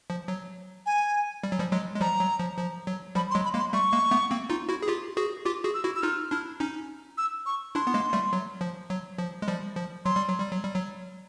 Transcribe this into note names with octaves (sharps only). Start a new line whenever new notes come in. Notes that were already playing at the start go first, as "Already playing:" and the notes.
F3
F#3
G#5
G3
F#3
F3 G3
F#3 G#3
G#3
F3 G3 A#5
F#3
F3
F3
F#3
F3 G3 B5
C6
F#3 G#3
B5
G#3 A#3
C6
G3 A3 C#6
G#3 A#3
A3 B3
A#3 C4
D#4 F4
E4 F#4
G#4
F4 G4
F#4 G#4
F4 G4 D6
F#4 G#4
E6
E4 F#4
E6
D#4 F4 F6
D4 E4
C#4 D#4
E6
C#6
D4 E4 C6
B3
G#3 A#3
G3 A3
F#3
F3
F#3
F3
G#3
F3 G3
F3
F#3 C6
G3
F#3
G3
F#3
G3
F#3